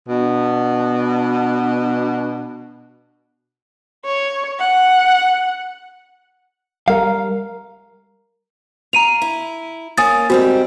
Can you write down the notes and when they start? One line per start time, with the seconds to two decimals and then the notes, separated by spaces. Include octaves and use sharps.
0.09 B2 D4
4.05 C#5
4.59 F#5
6.88 G3 A#4 F5
8.93 F4 A#5 D#7 F7
9.22 E4
9.97 A#3 C#4 G#5 D#6 A6
10.30 G#2 G3 C4 F#4